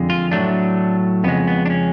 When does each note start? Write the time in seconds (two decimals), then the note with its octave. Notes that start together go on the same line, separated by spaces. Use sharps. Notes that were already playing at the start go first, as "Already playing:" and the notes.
Already playing: F2 D3 G#3
0.10 F4
0.32 A2 F#3 A3 D4
1.24 F2 C#3 G#3 B3
1.48 B3
1.66 D4
1.70 C#4